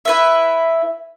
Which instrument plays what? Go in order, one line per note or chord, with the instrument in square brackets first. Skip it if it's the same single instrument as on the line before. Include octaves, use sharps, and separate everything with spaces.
[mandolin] E4 B4 E5